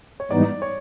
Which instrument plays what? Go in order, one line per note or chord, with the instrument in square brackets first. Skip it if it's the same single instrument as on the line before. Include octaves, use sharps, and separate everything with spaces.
[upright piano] C#5
[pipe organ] G#2 E3 G3 B3 D#4 [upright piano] D5
[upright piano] C#5